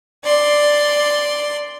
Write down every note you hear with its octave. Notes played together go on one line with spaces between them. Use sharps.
D5 C6